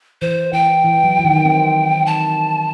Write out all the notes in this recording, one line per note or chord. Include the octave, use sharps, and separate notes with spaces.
E3 C5
E3 G5
E3
F#3
E3
D#3
C4
A5